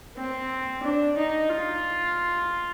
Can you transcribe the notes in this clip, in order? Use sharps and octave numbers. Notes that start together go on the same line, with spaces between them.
C4
D4
D#4
F4